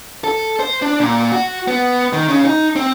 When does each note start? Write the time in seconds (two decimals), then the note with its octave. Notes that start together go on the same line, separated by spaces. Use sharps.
0.24 A4
0.60 C5
0.82 D4
1.00 A#2
1.32 F#4
1.68 B3
2.13 D#3
2.28 C#3
2.45 D#4
2.76 C4